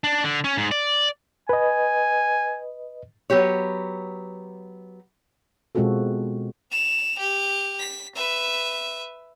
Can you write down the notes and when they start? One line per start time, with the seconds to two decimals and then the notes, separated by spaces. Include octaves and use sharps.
0.04 D4
0.24 D3
0.44 C#4
0.57 G#2
0.71 D5
1.49 B4 D#5 G#5
3.30 F#3 B3 G4 C#5
5.75 B2 G#3 C4 F4 F#4 A4
6.72 E7 F7
7.19 G4
7.79 B6
8.15 B4 E5